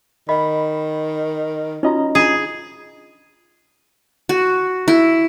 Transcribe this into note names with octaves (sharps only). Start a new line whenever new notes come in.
D#3 D#5 B5
C#4 D#4 F4 F#4 D#5 A#5
D4 F4 G#4
F#4
E4